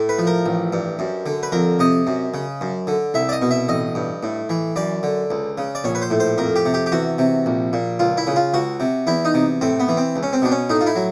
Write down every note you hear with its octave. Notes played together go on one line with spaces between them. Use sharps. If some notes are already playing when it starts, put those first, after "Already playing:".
Already playing: A2
B4
F3
A#4
A1
G2
F#2
D3
B4
F2 A#4
C3 D#5
F#2
C#3
F#2
D3
C2 E5
D5
D#5
B2
E5
A1 D#5
G2
A2
E3
F#2 D5
D3
C#2
C#3
D5
A#1 C#5
B4
C5
A2
C5
F2 A#4
G4
C3
G4
G4
E2 F#4
C3
A#1
A#2
C#2 F4
E4
C#3
F4
C#2 F#4
C3
E2 E4
D#4
C3
A2 C4
B3
E3
C4
C#2
C#4
C4
B2 D4
C#4
A2 D#4
F4
E4
F#3